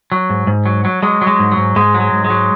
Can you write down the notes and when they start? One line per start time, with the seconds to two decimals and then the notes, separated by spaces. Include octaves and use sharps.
0.12 F#3
0.30 G#2
0.47 G#2
0.66 F#3
0.85 F#3
1.03 F#3 G#3
1.22 F#3
1.27 G#3
1.40 G#2
1.52 F#3
1.57 G#2
1.76 G#2 G#3
1.94 F#3
2.00 G#3
2.12 G#2
2.24 G#3
2.30 F#3